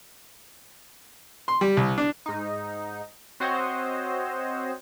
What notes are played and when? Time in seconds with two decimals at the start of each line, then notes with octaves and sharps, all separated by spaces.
1.48 C6
1.61 G3
1.77 C2
1.98 D4
2.26 G#2 D#4
3.40 C4 F#4 C5 C#5 D#5